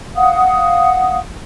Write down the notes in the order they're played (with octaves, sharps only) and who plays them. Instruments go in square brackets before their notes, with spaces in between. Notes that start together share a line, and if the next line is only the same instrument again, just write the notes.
[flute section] F5 F#5 D#6